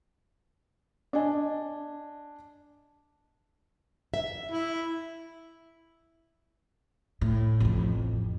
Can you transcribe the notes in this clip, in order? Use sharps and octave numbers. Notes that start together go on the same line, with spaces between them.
D4 D5 D#5 G#5
E5
E4
A2
A1 F2